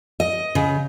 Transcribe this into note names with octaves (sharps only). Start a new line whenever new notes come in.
D#5
C#3